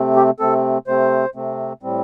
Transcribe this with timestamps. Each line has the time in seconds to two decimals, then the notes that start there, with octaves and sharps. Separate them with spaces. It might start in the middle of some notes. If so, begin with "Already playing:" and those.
Already playing: C3 A3 C4
0.16 G4
0.40 C3 A3 C4 A4
0.87 C3 A3 C4 C5
1.35 C3 A3 C4
1.83 A2 G3 C4